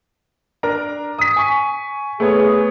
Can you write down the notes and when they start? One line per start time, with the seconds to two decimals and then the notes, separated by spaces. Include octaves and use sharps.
0.63 D4 A#4 A#5
1.19 D#6 B6
1.36 G#5 C#6
2.20 A3 B3 G#4 C#5